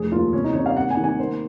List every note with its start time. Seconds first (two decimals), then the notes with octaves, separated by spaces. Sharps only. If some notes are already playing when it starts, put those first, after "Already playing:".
Already playing: F1 F3 G#4
0.12 D#2 F4
0.33 C3 C#4
0.44 D#4
0.55 C3 C#5
0.66 F5
0.76 D#2 F#5
0.91 G#5
0.97 D#3
1.04 G#5
1.19 A#3 C5